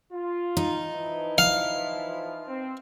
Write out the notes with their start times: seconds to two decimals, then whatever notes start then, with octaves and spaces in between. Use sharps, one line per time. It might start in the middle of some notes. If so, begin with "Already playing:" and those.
0.13 F4
0.57 D#4
0.93 E3 F3 E4
1.38 F5
2.47 C4